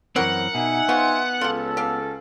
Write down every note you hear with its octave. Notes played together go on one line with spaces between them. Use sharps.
F#2 E3 C4 F#4 G4 A#4 F#5
B2 D#4 E5 G#5
B3 F4 F#4 C5
C#2 C#4 F4 G4 A4
G4 F5